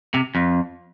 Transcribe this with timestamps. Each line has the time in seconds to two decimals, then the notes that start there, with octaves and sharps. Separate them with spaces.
0.14 C3
0.35 F2